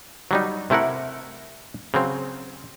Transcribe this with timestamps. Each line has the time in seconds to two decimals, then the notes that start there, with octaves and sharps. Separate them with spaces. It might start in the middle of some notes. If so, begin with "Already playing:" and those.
0.31 F#3 G3 D#4
0.70 C3 A3 E4 A#4 F#5
1.94 C#3 F#3 C4